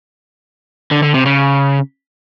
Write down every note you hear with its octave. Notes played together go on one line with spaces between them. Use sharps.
D3
D3
C3
C#3